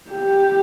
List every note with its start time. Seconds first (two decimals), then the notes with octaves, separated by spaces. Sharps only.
0.10 G4